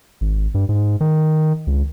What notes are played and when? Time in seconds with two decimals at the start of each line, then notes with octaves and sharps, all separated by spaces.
0.21 G#1
0.54 G2
0.69 G#2
1.01 D#3
1.67 C#2